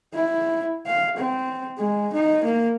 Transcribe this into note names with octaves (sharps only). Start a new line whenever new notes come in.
E4
F5
C4
G#3
D#4
A#3